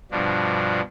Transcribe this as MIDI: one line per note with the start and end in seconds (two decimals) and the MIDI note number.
0.11 0.81 43
0.11 0.81 47
0.11 0.81 53
0.11 0.81 62